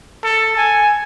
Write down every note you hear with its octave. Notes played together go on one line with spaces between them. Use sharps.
A4
G#5